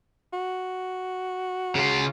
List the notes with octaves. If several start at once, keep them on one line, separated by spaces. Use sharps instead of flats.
F#4
C#3 F4